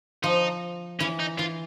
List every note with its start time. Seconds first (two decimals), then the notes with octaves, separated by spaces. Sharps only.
0.23 F3 D#4
1.00 E3 C#4
1.19 D#4
1.38 E3 F4